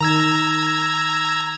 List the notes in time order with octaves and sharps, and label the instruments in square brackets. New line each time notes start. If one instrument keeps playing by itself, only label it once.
[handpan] D#3 [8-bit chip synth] A#5 E6 G#6